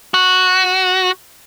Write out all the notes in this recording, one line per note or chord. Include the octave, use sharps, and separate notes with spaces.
F#4